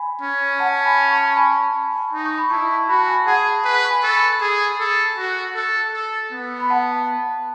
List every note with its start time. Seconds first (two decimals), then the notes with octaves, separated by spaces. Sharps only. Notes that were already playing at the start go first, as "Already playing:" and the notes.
Already playing: G#5 B5
0.21 C#4
0.59 F#5 A5
0.85 G#5 B5
1.10 A5 C#6
1.36 G#5 B5
2.13 D#4
2.25 C#6
2.38 B5
2.50 E4 A5 C#6
2.89 F#4 B5
2.98 A5
3.07 G#5 B5
3.26 G#4 F#5 A5
3.65 B4 G#5 B5
3.85 C#6
3.90 G#5 B5
4.03 A4
4.16 G#5 B5
4.41 G#4
4.79 A4
5.18 F#4
5.55 A4
5.94 A4
6.32 B3
6.60 B5
6.70 F#5 A5